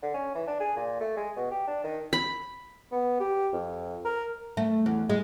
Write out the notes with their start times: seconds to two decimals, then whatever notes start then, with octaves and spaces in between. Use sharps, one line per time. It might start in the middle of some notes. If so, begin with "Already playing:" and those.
0.02 D3
0.14 C#4
0.35 E3
0.47 D4
0.60 G#4
0.77 A#2
1.01 A3
1.17 G#3
1.37 B2
1.51 G4
1.67 D4
1.84 D#3
2.13 B5
2.92 B3
3.20 G4
3.53 F2
4.05 A#4
4.57 A3
4.86 E2
5.10 G#3